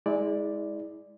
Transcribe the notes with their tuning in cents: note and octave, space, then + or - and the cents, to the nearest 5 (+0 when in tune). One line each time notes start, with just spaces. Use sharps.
G#3 +0 E4 -35 D5 +0